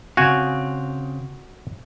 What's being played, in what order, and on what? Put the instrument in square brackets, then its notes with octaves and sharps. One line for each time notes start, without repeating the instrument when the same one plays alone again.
[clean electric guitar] C#3 C4 F5 [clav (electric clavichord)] F#4 G#5